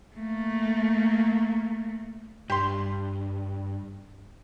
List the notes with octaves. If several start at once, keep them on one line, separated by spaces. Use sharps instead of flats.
A3 A#3
G2 G4 C6